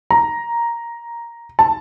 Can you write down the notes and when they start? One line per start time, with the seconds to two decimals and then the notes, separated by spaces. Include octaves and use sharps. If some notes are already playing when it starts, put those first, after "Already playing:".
0.11 A#5
1.59 A5